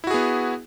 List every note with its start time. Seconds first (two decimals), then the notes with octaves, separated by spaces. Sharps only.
0.04 E4
0.07 F#4
0.11 G#4
0.14 B3